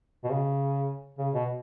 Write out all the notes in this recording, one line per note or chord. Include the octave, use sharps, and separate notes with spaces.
B2
C#3
C#3
B2